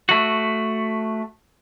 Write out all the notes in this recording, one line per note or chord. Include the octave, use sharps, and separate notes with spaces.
A3 F#4